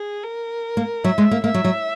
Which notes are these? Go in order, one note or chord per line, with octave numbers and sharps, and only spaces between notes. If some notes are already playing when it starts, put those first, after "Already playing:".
Already playing: G#4
A#4
A#3
F#3 E5
G#3
A#3
A#3 E5
F#3
F#3